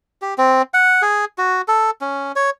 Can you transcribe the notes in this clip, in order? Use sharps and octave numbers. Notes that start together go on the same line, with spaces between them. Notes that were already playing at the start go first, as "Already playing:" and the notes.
G4
C4
F#5
G#4
F#4
A4
C#4
C#5